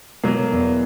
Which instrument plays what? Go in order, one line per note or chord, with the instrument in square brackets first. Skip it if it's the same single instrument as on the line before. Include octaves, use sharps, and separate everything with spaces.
[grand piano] B2 [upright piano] F#3 A#3
[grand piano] E2